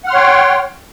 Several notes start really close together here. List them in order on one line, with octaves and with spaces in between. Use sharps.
F#5 F6 C6 C#5 G5